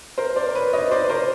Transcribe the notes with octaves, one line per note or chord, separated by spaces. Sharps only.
A#4 C5
C5 D5
B4 C#5
C#5 D#5
C5 D5
A#4 C5